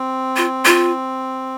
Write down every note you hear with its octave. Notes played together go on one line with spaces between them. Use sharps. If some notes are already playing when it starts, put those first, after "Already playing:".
Already playing: C4
F4
F4